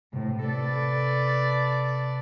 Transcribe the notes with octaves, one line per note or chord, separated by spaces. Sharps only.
A2 C3
A4 B4 D5